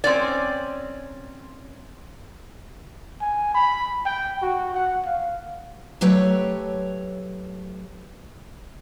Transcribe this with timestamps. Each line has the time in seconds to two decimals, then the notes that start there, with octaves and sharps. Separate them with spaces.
0.04 C4 C#4 D5
3.21 G#5
3.54 B5
4.05 G5
4.42 F#4
4.74 F#5
5.05 F5
6.01 F#3 A3 G4 B4 C#5 G5